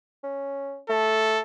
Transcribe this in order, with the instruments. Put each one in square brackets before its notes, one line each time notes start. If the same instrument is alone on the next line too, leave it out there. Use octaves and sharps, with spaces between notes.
[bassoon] C#4
[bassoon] A3 [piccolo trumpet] A4